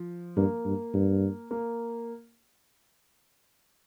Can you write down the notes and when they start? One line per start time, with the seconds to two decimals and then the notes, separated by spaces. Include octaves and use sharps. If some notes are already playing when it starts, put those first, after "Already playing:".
Already playing: F3
0.36 G2 A#3
0.65 G2
0.94 G2
1.51 A#3